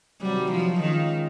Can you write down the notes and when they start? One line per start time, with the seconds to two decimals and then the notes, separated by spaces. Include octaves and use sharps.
0.22 C3 D#3 F#3 G3
0.52 F3
0.81 D#3 G#3 C#4 F4